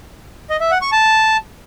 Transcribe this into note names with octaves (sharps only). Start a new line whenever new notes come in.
D#5
E5
F#5
C#6
A5